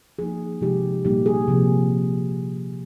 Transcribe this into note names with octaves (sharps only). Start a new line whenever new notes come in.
F3 A#3 D#4 G#4
C3 F3 G#3 D#4 G4
A#2 G3 A#3 D#4 G4
G#4
C3 F3 A#3